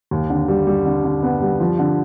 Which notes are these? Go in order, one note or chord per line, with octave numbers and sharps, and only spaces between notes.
D#2
D3
G3
G3
D3
D3
B3
G3
F3
D3